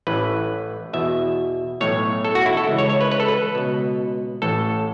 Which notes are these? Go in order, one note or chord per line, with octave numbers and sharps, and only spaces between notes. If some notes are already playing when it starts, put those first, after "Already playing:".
A1 A2 E3 B4
E2 B2 E5
B1 A2 E3 C#5
A4
F#4
E4
A4
C#2 C#3 E3
C#5
C#5
B4
B4
A4
B4
C#2 B2
A1 A2 E3 A4